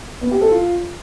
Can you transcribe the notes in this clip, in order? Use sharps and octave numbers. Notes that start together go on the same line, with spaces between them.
B3
G4
A4
F4